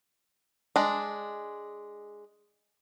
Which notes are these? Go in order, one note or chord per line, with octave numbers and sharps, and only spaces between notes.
G#3 D4